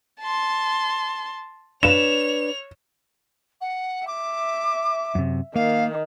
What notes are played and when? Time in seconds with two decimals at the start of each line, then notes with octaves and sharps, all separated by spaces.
0.20 A5 C6
1.83 D4 B4 C#5 E7 F7
3.61 F#5
4.07 E5 D6
5.15 F#2 C3
5.56 D#3 A#3 F5